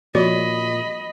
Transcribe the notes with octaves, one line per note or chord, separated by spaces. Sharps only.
A#2 F3 F#4 D5 D#5 B5